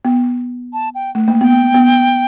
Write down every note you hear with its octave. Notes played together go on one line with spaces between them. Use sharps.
B3
A5
G5
A3
A#3
B3 G5
B3